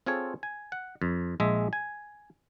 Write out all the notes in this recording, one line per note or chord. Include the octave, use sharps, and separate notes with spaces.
C4 F4 G#4 A4 C#5
G#5
F#5
F2
A#1 G#3 G#4 D#5 E5
G#5